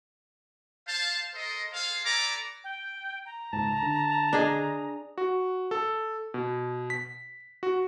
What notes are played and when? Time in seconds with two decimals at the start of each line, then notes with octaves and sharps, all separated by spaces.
0.87 C5 F5 A5
1.35 A4 A#4 C5 D#5
1.72 G#4 A4 C5 F5
2.04 A4 B4 D5 G#5 A#5 D6
2.64 G5
3.26 A#5
3.53 C#2 G#2 A5
3.82 D3
4.33 D4 G#4 D#5
5.18 F#4
5.71 A4
6.34 B2
6.90 B6
7.63 F#4